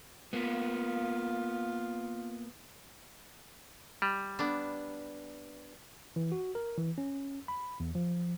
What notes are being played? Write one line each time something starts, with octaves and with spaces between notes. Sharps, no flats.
A#3 B3 F4
G3
B3 D4
E3
F#4
A#4
E3
C#4
B5
E2
F3